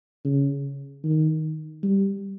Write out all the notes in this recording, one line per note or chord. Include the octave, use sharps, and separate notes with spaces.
C#3
D#3
G3